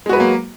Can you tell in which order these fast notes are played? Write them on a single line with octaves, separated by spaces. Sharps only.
G#3 F#4 B4 F#3 A#3